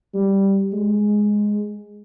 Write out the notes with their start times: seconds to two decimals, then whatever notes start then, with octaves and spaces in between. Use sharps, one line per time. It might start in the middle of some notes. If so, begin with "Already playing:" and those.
0.14 G3
0.73 G#3